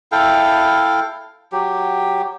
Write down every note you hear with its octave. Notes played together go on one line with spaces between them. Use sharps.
E4 A4 F5 G5
F#3 G4